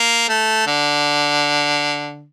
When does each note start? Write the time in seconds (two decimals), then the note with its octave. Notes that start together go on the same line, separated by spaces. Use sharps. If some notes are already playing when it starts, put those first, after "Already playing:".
Already playing: A#3
0.29 A3
0.67 D3